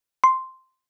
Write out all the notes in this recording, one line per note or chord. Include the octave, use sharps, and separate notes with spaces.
C6